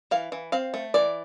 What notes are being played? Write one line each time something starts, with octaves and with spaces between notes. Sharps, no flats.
E3 F5
E3
C4 F5
A3
E3 D5